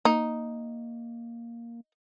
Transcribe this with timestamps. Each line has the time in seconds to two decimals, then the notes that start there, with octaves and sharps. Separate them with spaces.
0.05 A#3 D#4